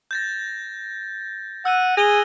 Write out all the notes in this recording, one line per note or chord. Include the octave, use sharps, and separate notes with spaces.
G6 A6 A#6
F#5 E6 F#6 D#7
G#4 A#6 F7 G7